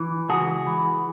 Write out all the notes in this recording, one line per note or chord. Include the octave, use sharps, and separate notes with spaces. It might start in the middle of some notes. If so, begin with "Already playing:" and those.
Already playing: E3
C#2 F#4 G#4
E3